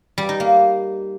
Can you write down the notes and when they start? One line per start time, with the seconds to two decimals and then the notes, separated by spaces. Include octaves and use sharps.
0.18 G3
0.29 D#4
0.40 A#3